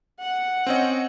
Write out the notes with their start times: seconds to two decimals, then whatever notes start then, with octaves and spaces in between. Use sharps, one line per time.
0.20 F#5
0.67 C4 C#4 D#5